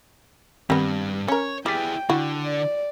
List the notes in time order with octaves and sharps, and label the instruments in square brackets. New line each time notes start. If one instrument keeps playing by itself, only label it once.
[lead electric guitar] G2 [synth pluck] D#3 C4 A#6 [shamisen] G3 B3
[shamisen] C#4 A#4 [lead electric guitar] C#5
[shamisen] G3 [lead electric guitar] E4 G#4 [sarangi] G5 [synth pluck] D6 A6 B6
[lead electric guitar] D3 [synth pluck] E4 [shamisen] F#4
[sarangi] D5